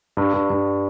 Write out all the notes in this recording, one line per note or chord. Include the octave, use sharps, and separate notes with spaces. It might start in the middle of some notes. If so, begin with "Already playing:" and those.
G2
G2
G2